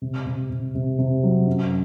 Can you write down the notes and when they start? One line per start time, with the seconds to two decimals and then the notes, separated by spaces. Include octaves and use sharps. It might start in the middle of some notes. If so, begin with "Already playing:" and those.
0.02 C3
0.26 C3
0.50 C3
0.75 C3
0.99 C3
1.23 F#3
1.47 F#2